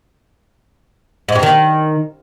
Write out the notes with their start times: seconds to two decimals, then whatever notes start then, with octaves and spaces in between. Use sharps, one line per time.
1.28 G#2
1.36 G2
1.43 D#3